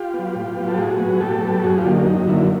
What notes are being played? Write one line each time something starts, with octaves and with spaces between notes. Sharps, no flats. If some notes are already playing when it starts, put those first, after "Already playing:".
Already playing: F4 G4
B3
F#3
A2
F#3 B3
A4
A2 F#4 G#4
F#3 B3
A2 G4 A4
F#3 B3
F#2 F#4 G#4
F4 G4
D3 F#3 A#3
D#4
F#2 D#4
D3 F#3 A#3 E4